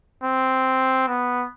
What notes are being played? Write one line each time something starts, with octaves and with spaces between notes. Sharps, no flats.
C4
B3